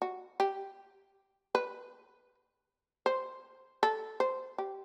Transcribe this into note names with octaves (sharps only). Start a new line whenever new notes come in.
F#4
G4
B4
C5
A4
C5
G4